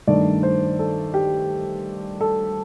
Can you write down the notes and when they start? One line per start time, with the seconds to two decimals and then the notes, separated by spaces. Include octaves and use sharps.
0.07 G2 D#3 A3 D4 D5
0.43 C5
0.79 A4
1.14 G4
2.21 A4